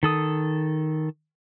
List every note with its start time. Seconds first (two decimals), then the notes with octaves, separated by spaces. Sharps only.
0.03 D#3 A4 D#6